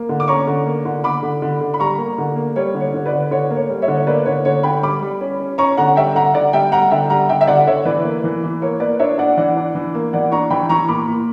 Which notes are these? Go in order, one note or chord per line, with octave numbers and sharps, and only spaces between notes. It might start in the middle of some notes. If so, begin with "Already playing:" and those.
Already playing: A#3
D3
D6
C#4 A#5 C#6
D3
A#3
D3
D3 B5 D6
D3
D3
D3
B5
G3 A#5 C#6
A#3
D3
A#3
G3 C#5
D3
C#5
D3
B4 D5
D3
D3 C#5
A#3
C#5
G3
C#5 E5
D3
C#5
A#3 B4 D5
D3 C#5
D3 C#5
D3 G5 B5
G3 B5 D6
G3
C#4
C#4
C#4 A#5 C#6
D3 F#5 A#5
G3 E5 G5
D3 F#5 A#5
D3 D5 F#5
G3 E5 G5
G3 F#5 A#5
D3 E5 G5
G3 F#5 A#5
D3 E5 G5
E5
D3 D5 F#5
D3 C#5 E5
E3 B4 D5
A#3
E3
E3
A#3 C#5
A#3 B4 D5
D4 C#5 E5
D4 D5 F#5
E3 D5 F#5
D4
E3
A#3
E3 D5 F#5
D4 A#5 C#6
E3 G5 B5
E3 A#5 C#6
A#2 B5 D6
A#2